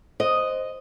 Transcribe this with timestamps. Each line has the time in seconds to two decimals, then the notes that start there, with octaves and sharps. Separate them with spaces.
0.20 C5 D#5